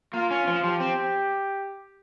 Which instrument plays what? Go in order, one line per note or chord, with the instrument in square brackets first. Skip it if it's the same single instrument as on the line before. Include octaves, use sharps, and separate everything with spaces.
[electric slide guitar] A#3 [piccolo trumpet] F4
[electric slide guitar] C#4
F3
[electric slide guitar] F3 [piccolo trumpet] G4
[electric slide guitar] C4